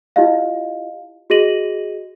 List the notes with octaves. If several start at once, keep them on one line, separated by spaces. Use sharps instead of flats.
E4 F4 G4 D#5 F5
F#4 G#4 D#5 A#6 D#7 F#7